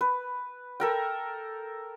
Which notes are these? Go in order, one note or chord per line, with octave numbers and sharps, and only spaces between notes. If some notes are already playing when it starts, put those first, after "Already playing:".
B4
A4 A#4 G5